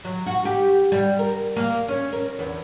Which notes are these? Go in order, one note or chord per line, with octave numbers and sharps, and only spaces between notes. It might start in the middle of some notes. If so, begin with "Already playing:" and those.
F#3
F#4
G4
G3
A#4
A#3
C#4
A#4
E2